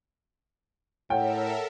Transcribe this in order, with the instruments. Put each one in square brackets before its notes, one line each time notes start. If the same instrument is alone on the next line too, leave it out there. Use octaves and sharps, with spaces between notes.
[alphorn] A2 [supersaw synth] A4 A#4 E5 [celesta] C#5 F#5 [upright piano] G5